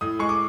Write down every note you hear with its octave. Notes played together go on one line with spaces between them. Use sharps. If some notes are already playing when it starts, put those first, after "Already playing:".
A2 D#6
G#3 C#6
D6